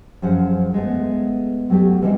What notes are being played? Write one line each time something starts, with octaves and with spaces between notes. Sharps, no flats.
F#2 F3 G#4 C5 F#5
G#3 A3 B3
F#3 G3 A3 G4
E3 G3 G#3 C4 E4